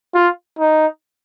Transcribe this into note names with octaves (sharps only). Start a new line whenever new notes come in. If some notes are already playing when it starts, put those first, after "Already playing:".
F4
D#4